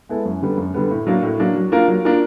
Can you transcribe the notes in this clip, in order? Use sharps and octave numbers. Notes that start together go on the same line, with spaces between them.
G#3 B3 E4 A4
F#2
D3 G3 B3
F#2
D3 G3 B3
A2
F#3 A#3 D4
A2
F#3 A#3 D4
F#3
A#3 D4 F4 A#4
F#3
A#3 D4 F4 A#4